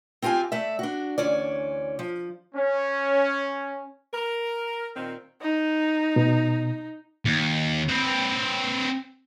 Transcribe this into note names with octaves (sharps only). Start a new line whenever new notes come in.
C4 F4 G4 F5 G#5
A3 D5 E5
D4 F#4
D2 E3 C#4 D5
F3
C#4
A#4
A#2 D#3 C4
D#4
B2
D#2
C4 B4